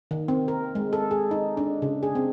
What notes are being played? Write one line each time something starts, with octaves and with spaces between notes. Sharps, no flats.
D#3
C4
A#4
G#3
A4
G#4
D#4
D4
C#3
G#4
C4